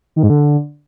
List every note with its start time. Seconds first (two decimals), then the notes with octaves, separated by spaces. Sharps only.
0.16 D#3
0.23 G#2
0.30 D3